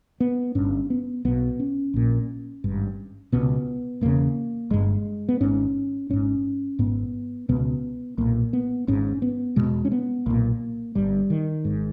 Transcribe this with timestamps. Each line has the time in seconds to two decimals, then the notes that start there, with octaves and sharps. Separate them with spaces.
0.20 B3
0.55 G1 G2 C#4
0.90 B3
1.25 B1 B2 B3
1.60 C#4
1.94 A#1 A#2
2.64 G#1 G2
3.32 C#2 B2 B3
4.01 E1 E2 C#3 A#3
4.70 G1 G2 G#3
5.29 B3
5.41 G#1 G#2 C#4
6.09 G#1 G#2 C#4
6.79 G#1 G#2 B3
7.49 C#2 B2 B3
8.18 B1 A#2 A#3
8.53 B3
8.87 G#1 G#2 C#4
9.22 B3
9.56 E1 E2 B2 G#3
9.85 C#4
9.92 B3
10.26 B1 A#2 A#3
10.95 G1 G2 G3
11.30 D#3
11.65 G#1 G#2